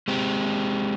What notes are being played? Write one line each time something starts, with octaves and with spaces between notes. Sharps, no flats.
G#3 C4 G4